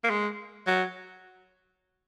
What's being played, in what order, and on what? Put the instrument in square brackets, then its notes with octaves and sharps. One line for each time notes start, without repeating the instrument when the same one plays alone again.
[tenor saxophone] A#3
G#3
F#3